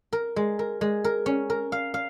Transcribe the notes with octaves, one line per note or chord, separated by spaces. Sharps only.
A#4
G#3
A#4
G#3
A#4
C#4
A#4
F5
F5